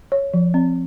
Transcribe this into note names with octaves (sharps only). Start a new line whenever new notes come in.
C#5
F3
C4